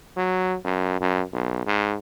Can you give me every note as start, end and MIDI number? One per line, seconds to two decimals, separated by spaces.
0.16 0.56 54
0.64 0.98 42
1.00 1.22 42
1.33 1.64 35
1.66 1.96 44